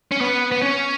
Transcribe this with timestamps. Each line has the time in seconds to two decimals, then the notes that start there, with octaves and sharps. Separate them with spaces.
0.12 C#4
0.21 B3
0.52 B3
0.62 C#4